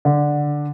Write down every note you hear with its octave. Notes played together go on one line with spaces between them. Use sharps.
D3